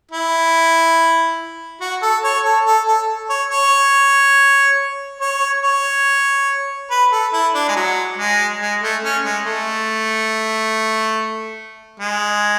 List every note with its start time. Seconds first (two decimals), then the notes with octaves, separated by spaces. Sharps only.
0.11 E4
1.81 F#4
2.02 A4
2.24 C#5
2.45 A4
2.66 A4
2.87 A4
3.30 C#5
3.51 C#5
5.21 C#5
5.63 C#5
6.91 B4
7.12 A4
7.33 E4
7.54 D4
7.68 G#3
7.76 F#3
8.18 G#3
8.61 G#3
8.82 A3
9.03 C#4
9.24 G#3
9.45 A3
12.00 G#3